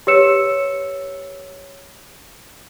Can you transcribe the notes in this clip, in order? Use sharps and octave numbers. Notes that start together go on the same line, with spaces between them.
G4 B4 C#5 E6 C#7 E7